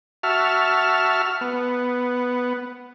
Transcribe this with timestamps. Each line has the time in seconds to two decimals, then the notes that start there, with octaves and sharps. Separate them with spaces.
0.23 F#4 E5 A5 F6
1.41 B3